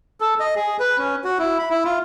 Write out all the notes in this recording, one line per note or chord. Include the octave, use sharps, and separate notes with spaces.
A4
D#5
G#4
B4
C#4
F#4
E4
B5
E4
F4